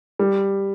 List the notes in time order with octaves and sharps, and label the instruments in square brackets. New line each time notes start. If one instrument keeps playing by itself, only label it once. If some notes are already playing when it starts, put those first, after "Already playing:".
[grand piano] G3